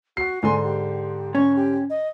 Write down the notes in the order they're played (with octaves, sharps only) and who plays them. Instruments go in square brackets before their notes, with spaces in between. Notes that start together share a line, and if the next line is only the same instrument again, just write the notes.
[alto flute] F#4 [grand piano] C7
[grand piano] G#2 D3 C6 [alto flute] G#5
[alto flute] G4
[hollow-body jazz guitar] C#4 [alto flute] C#6
[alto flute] G4
D#5